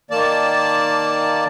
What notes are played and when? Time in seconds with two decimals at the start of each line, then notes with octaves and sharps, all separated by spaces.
0.11 D#3 A#3 D5 A5